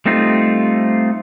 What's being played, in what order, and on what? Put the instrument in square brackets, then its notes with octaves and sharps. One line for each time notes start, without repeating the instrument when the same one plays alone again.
[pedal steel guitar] G3 A3 C4 D#4 F4